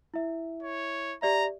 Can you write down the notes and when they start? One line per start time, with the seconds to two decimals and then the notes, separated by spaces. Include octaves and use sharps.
0.14 E4 E5
0.63 C#5
1.22 G4 D5 E5 A#5